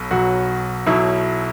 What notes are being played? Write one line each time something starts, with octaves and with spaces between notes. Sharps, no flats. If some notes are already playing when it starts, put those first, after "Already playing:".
Already playing: B1 B2 F#3
B1 B2 F#3 F#4
B1 B2 F#3 E4